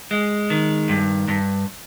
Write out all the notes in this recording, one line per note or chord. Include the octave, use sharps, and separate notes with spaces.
G#3
D#3
G2
G2